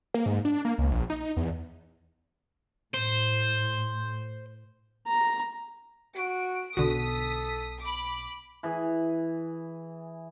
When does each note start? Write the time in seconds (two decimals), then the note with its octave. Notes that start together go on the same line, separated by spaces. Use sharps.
0.14 A#3
0.26 G#2
0.45 D4
0.65 A#3
0.78 C#2
0.91 A#1
1.10 D#4
1.37 E2
2.94 A2 C5
5.08 A#5
6.16 F#4 D7
6.77 B1 B2 D3 F#4 A4 D#6 B6
7.82 B5 D6
8.63 E3 G#4